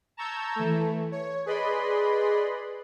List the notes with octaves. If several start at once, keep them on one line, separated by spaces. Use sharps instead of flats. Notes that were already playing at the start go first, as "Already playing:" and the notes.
A5 A#5 C#6 E6 G6 G#6
E3 A3
C#5
G#4 B4 D5 D#5 B5 C6